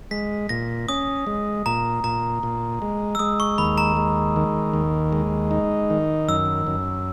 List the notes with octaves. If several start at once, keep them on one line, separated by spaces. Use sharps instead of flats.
G#3 B6
A#2 A#6
C#4 D#6
G#3
A#2 A#5
A#2 A#5
A#2
G#3
E6
G#3 D#6
C#6
D#2 B5
A#5
G#3
D#3
D#2
G#3
D#4
D#3
F#2 E6
F#2